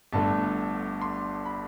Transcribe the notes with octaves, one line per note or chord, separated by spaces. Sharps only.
G1 G2 D3 A3 A5
C6
B5